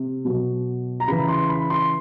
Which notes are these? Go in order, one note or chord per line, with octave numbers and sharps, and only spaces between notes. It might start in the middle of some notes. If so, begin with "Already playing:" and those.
Already playing: C3
B2 F#3
A#5
C#3 E3 B5
C6
B5
C6